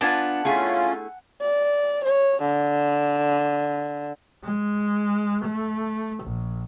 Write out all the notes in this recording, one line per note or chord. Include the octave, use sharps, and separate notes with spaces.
B3 D4 F4 F#5 G#5 A5
A3 C#4 E4 F4 G#4
D5
C#5
D3
G#3
A3
A#1